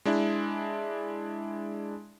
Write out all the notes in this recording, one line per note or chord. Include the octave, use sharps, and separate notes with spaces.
G#3 D4 E4